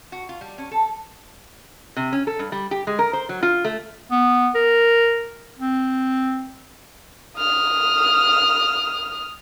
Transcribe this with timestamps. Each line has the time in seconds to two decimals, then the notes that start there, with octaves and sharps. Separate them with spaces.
0.12 F#4
0.29 F4
0.41 G3
0.58 C#4
0.71 A4
1.96 C3
2.13 C#4
2.27 A4
2.39 G2
2.52 G3
2.71 G4
2.87 G#3
2.99 A#4
3.13 C5
3.29 F#3
3.43 F4
3.64 A3
4.11 B3
4.55 A#4
5.59 C4
7.38 D#6 F6